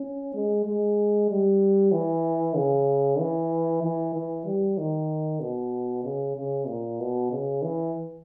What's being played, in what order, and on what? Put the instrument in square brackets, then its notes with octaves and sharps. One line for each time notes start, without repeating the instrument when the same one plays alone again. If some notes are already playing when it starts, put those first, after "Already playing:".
Already playing: [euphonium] C#4
G#3
G#3
G3
E3
C#3
E3
E3
E3
G3
D#3
B2
C#3
C#3
A#2
B2
C#3
E3